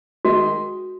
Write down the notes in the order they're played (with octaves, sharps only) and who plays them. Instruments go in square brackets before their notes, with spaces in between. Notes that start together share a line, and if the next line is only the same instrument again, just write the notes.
[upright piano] D#3 G#3 D#4 [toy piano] F#4